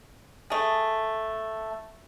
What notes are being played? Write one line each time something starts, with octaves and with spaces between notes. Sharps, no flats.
A3 G#4